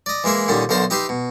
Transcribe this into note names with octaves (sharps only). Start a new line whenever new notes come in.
D5 D#5
E3 G#3 A#3 G#4 E5
A#2 D3 D#3 G3 C#4 D#4
B1 D3 A#4 C5 A5
D#4 G4 B4 E5 G5 C6
B2